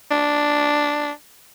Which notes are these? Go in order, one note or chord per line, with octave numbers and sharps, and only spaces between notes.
D4